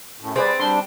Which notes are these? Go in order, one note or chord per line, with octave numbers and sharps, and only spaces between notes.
F#2 A2
G3 C4 G#4 B4 D5
G3 D4 C6